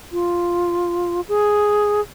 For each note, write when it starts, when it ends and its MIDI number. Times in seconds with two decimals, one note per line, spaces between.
0.12 1.21 65
1.28 2.01 68